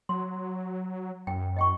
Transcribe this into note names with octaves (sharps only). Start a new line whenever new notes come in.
F#3 C6
F#2 G5
D#5 G5 C#6